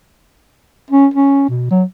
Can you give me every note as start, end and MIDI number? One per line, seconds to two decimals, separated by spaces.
0.91 1.07 61
1.14 1.47 61
1.49 1.68 47
1.71 1.83 54